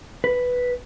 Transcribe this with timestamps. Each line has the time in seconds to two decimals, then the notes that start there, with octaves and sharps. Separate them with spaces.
0.24 B4